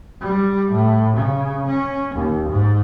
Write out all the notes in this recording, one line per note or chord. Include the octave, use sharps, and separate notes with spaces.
G3
A2
C#3
C#4
D#2
G#2